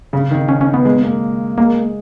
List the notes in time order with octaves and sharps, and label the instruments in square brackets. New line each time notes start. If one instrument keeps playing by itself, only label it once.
[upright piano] C#3
D#3
[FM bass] C#4
C#4
B3
[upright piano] G#3
A#3
[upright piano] G#3 [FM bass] A#3